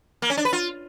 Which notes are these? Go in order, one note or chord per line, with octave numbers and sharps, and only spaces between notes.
A#3
C#4
D4
B4
F4